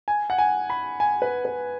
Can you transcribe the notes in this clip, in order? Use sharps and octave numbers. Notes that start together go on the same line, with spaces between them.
G#5
F#5
G#5
B5
G#5
B4
B4